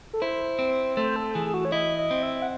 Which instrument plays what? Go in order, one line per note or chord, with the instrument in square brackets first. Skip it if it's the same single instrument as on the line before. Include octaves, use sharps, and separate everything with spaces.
[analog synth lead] A4
[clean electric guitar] E4 [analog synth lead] C5
[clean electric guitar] C4
[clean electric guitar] A3 [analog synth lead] C5
[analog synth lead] A4
[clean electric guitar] E3 [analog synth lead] G#4
[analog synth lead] G#4
F#4
C#5
[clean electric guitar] E4 [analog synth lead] D#5
[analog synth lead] D#5
[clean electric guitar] C4
[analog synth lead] E5
F#5